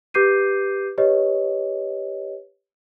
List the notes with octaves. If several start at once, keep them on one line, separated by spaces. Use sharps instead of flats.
G4 B4 D6 G6 C7 D#7
G4 B4 C#5 D#5